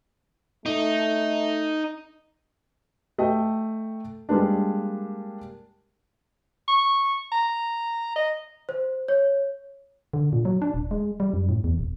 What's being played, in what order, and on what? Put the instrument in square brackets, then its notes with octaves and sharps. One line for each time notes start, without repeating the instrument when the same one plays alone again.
[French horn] A3 [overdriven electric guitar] D#4
[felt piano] A3 D#5 G5
G3 G#3 A#3 D4
[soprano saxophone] C#6
A#5
D#5
[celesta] C5
C#5
[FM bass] D3
A#2
F#3
D4
D#1
G#3
G3
F#2
A2
E2
D#1